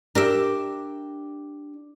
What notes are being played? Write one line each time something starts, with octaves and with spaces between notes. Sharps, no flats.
D4 G4 A#4 E5